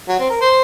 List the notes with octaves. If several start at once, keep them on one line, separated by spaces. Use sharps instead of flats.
F#3
C4
A#4
C5